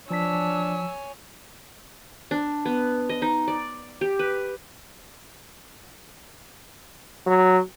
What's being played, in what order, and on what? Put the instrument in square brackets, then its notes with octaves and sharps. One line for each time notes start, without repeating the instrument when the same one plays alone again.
[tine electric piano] F3 A5 B6 [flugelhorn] D4 [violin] C#5 G#5 [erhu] E6
[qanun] D4
B3
D#5
D#4
D5
G4
B4
[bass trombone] F#3